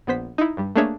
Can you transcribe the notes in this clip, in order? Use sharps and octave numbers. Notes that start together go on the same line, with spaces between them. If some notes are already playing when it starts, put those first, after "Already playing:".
A#1 B3 C5 B6
D#4 E4
G2 G3
A3 A#3 D4 G#4 C#5 E5